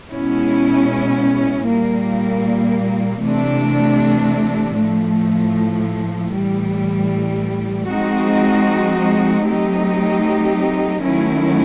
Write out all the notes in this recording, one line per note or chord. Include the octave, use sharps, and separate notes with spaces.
B2 G#3 C#4 E4
A#2 G3 A#3
C3 E3 A3 D4
A2 F3 A3
A2 E3 G3
F3 G#3 C4 D#4 F#4
F#3 A3 C4 D#4 G4
D#3 F#3 A3 C#4 E4